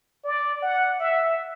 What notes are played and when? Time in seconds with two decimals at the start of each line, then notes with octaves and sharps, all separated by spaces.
0.24 D5
0.62 F#5
1.00 E5